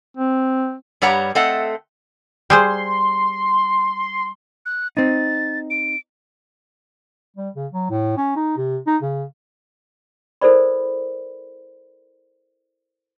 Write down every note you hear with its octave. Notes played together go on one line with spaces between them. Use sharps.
C4
G2 G3 G4 C#5 F#5 A#5
A3 C4 D#5 F#5
G3 G#4 C5 C6
F#6
C4 D#4 A6
D7
G3
C#3
F#3
A2
C#4
D#4
C3
D#4
C#3
E4 A4 A#4 C5 D5 B5